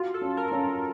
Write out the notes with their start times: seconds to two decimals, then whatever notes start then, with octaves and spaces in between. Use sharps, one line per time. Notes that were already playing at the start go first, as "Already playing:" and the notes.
Already playing: F4 F#4
0.14 A4
0.21 C#4
0.37 A#4
0.52 C#4